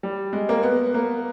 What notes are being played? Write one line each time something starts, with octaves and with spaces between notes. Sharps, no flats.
G3
G#3
A#3
B3
A#3